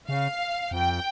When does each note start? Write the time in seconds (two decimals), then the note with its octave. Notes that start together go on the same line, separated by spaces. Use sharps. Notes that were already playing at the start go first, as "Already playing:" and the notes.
0.08 C#3 F5
0.71 F2 G5